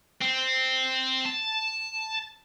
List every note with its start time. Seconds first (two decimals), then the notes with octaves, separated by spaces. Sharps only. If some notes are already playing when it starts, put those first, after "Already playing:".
0.22 C4
1.26 A5